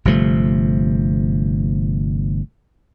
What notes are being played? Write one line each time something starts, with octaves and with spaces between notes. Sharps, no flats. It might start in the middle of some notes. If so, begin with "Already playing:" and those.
G1 C3 F3 A3